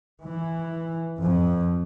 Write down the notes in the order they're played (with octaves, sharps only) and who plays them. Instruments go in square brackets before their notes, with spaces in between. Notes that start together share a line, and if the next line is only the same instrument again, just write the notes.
[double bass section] E3
F2